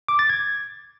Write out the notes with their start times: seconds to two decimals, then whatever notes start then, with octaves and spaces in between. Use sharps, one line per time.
0.08 D6
0.19 A6
0.30 G#6